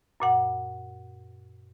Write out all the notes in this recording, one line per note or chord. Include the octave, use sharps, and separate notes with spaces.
F#2 A#2 F#5